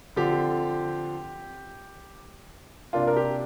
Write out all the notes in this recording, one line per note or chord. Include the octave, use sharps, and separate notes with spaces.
D3 F3 C4 G4
C3 A#3 D4 F4
A#4
G4